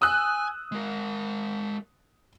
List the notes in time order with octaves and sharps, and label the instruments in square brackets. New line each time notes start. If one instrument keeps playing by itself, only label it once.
[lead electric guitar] G#5 [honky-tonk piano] D#6 E6 F#6
[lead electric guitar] G#3 A#4